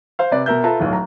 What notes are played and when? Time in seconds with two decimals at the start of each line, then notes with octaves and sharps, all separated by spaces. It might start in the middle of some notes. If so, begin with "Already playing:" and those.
0.19 C5 F5
0.31 C3 B4 D5
0.46 B2 A#4 E5 G6
0.63 F4 A4 B4 E5 A5 A#5
0.80 D1 B1
0.93 A#5